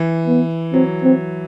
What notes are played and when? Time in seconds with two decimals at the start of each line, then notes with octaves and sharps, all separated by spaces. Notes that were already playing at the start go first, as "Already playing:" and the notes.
Already playing: E3
0.27 B3
0.73 F#3 C4
1.04 C4